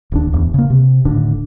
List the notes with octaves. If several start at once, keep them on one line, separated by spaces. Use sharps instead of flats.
D1 D#2 D4
D1 E2
C#3 A#3
C3
D#1 A2 D3 D4